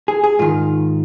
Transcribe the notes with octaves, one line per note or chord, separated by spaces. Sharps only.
G#4
G#4
G#2 D#3 F4